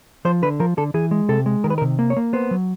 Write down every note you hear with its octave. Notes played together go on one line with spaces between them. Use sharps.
F3 C5
D3 B4
F3 A#4
D3 A4
E3 G#4
G#3
C3 A4
G#3
D#3 A#4
B4
A#4
C3
A#3
C#5
A#3
B3 C5
F#3